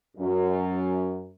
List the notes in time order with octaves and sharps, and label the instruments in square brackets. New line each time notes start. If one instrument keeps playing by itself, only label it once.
[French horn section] F#2